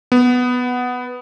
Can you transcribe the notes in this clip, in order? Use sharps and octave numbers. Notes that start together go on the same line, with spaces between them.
B3